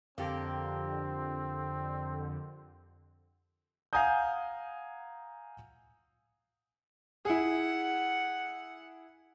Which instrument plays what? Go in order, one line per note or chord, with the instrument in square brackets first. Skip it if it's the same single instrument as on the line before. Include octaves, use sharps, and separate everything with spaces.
[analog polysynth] F2 D3 [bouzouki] A#3 G4 [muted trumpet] C4
[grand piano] F5 F#5 G#5 A#5 D#6 G6
[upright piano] E4 G#4 [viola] F#5